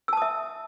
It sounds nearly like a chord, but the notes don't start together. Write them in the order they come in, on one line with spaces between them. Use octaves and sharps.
E6 A5 D#6 E5